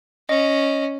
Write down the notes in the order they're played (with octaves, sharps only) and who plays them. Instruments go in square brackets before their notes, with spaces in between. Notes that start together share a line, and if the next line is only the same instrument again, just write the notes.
[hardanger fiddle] C#4 [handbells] D#5